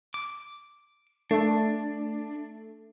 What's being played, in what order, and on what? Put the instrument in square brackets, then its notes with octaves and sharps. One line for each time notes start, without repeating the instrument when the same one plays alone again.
[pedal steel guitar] D6
[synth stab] A3 [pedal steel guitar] D4